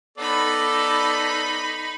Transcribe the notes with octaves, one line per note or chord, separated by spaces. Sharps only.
B3 D#4 A4 D5 B5